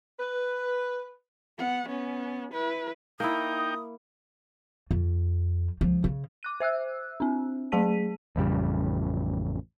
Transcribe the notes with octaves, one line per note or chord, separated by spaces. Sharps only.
B4
B3 F#5
B3 C#4
E4 B4
A#3 D#4 E4 G5 D#6
F2
C#2 F3
C#3
D6 F#6 D#7
C5 E5 E6 F#6
C4 D4
F#3 A3 G#4 A5 B6 D#7
A1 F2 C#3 G3